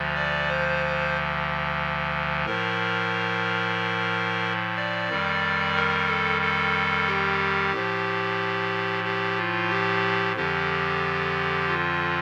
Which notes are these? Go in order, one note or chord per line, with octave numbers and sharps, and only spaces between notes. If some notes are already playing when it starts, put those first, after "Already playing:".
Already playing: D2 D3 F3
D5
C5
A2 F3 A#4
D5
F2 D#3 G3
A#4
A4
A4
G4
A2 F3
G4
F4
G4
F2 D3 F3 G4
F4